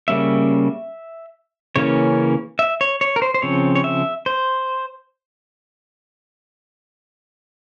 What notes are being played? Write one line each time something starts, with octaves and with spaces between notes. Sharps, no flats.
C#3 G3 A#3 C#4 E5
C#3 E3 A#3 C#4 C#5
E5
C#5
C#5
A#4
C5
C5
C#3 F3 C4 C#5
C#5
E5
C5